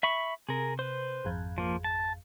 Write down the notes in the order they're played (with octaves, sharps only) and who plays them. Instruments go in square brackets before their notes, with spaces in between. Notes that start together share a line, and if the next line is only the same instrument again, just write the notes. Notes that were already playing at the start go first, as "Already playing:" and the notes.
[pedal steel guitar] E5 B5 C#6
[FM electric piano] C3 [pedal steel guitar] G#4 A#4
[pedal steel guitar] B4 C5
[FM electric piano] G#1 F2
[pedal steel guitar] F3 A#3
A5